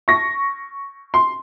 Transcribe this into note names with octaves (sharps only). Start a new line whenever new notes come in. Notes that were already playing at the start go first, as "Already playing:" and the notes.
C#6 A#6
C6